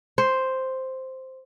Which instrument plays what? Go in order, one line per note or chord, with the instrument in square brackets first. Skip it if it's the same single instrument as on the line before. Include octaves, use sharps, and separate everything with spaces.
[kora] C5